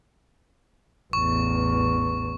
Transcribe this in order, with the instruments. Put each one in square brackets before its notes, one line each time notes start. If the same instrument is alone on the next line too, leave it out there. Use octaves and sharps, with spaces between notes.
[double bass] A1 E2 [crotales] C#6